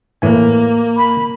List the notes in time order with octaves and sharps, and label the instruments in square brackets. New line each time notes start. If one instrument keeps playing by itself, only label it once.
[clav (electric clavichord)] A2 E3 G#5 [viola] A#3
[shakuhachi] B5